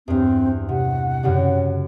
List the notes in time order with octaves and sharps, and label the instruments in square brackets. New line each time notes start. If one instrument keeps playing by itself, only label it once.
[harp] E2 G2 [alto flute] C4
[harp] C3 [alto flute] F#5
[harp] F#2 C#3 G3